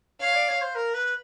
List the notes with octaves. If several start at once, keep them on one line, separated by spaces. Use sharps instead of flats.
C#5 F5
D5
C#5
C5
A#4
B4